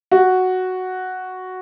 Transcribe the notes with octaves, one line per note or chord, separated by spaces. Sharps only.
F#4